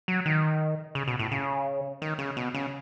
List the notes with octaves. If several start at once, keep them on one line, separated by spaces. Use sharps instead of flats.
F#3
D#3
C#3
B2
A2
C#3
D#3
C#3
B2
C#3